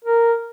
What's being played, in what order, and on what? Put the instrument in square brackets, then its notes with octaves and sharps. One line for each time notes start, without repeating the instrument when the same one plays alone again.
[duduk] A#4